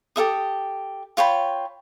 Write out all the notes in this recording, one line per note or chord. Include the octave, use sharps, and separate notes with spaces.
G4 A4 E5 D#6
F4 C#5 G5 B5